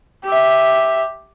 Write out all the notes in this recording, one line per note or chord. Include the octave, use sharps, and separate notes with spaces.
G4 E5